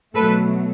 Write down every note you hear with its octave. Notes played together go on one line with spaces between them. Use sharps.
B2 F#3 A3 A4 B4